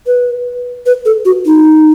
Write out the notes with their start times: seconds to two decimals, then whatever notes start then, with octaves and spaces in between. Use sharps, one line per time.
0.07 B4
0.86 B4
1.05 A4
1.25 F#4
1.46 D#4